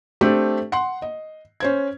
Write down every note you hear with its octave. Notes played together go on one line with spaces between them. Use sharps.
A3 C4 D4 G4
F#5 C6
D#5
C#4 C5 G#6